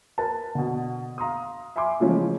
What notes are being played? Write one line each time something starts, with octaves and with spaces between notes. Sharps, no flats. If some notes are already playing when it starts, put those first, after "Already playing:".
A#4 B4 A5
B2 D3
F5 A#5 C6 D#6
E5 G#5 B5 C6 D6
C#3 E3 F3 G#3 A3 C#4